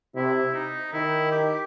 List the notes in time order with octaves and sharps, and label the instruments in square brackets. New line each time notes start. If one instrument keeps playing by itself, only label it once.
[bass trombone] C3 [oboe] E4
[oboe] D#4
[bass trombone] D#3 [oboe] E4
[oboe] G4